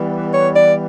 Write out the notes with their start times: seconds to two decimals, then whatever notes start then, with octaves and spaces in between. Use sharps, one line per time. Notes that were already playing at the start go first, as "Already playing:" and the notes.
Already playing: E3 G3 B3
0.33 C#5
0.56 D5